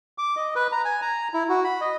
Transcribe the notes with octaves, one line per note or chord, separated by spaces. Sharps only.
D6
D#5
B4
A#5
G#5
A#5
E4
F#4
B5
D#5